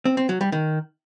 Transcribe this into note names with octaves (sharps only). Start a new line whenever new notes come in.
C4
C4
F#3
G3
D#3